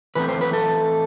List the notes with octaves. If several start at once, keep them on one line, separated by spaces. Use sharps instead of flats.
E3 A3 C4 B4
C5
B4
A4